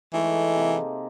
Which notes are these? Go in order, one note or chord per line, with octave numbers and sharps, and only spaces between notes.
E3 G#3 A3 D#4
C3 A#3